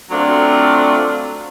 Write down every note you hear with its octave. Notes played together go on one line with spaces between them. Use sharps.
F#3 A3 C4 D4 F4